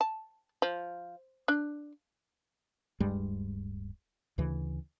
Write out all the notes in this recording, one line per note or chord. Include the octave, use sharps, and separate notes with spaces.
A5
F3
D4
D1 G2 G3 G#3
D2 C#3 E3